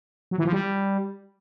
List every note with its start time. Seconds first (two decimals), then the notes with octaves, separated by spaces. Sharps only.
0.31 F#3
0.38 E3
0.45 F3
0.52 G3